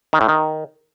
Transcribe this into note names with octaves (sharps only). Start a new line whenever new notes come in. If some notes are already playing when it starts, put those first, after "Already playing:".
D#3
A2
D#3